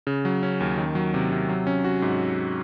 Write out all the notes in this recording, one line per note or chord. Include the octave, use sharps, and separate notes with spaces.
C#3
F#3
C#4
D#2
D#3
F#3
C3
C3
F#3
C#4
F#4
G#2